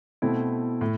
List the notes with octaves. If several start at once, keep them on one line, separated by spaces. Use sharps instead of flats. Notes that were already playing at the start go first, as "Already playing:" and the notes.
B2 A3 C4 E4
A2